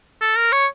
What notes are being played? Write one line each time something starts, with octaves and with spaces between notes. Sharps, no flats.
A4
A#4
C#5